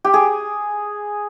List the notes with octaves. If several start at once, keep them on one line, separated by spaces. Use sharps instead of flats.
G4
G#4